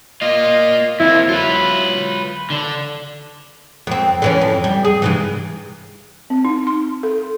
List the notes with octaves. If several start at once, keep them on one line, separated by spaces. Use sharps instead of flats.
A#3 F4 D#5
F2 A#3 E4
F#3 F4 B4
D3
F2 C4
D3 E3 C#4
F2
G3
G#4
G2 C3 E3
C4
D#4
C6
A4